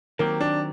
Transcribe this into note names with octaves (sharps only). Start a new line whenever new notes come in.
D#3 F#3 A#3 C4 G4
D4